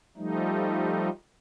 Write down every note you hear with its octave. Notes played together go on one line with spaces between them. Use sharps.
F3 G3 A3 D#4